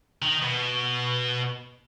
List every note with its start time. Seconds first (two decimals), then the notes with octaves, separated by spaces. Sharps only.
0.22 D#3
0.42 B2